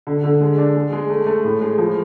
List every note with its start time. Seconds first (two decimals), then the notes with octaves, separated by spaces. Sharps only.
0.07 D3
0.24 D3
0.41 G#3
0.58 D4
0.75 G#3
0.93 G#3
1.10 A3
1.26 A3
1.44 A2
1.61 G#3
1.78 F3